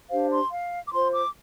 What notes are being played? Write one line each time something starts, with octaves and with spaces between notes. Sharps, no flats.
D4 G4 C5 F5
C6
F5
D6
F4 C5 C6
D6